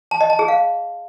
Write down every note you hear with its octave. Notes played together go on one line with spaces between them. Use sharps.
A5
D#5
A5
G#4
F5